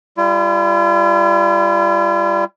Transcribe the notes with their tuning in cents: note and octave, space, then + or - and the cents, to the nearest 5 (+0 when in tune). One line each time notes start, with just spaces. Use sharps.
G3 +0 F4 -45